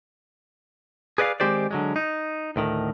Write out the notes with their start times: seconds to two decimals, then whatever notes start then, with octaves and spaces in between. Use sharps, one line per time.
1.18 G#4 B4 D5 D#5 F5
1.40 D#3 G#3 C4 G4 C5 D5
1.71 D3 F#3 G#3
1.96 D#4
2.56 D2 A2 D#3